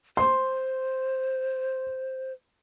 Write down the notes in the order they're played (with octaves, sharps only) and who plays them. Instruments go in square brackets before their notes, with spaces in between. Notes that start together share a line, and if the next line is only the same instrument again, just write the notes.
[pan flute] C5 [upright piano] C6